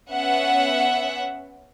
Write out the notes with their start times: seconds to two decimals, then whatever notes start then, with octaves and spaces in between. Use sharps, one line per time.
0.11 B3 C#4 E5 F#5